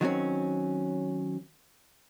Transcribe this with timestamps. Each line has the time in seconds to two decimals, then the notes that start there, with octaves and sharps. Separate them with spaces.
0.01 D#3 F#3 C4 C#4